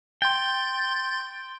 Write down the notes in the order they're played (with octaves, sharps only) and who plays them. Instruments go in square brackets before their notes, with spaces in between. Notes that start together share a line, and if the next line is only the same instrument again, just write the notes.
[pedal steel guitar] G5 [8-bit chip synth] C6 G6 A6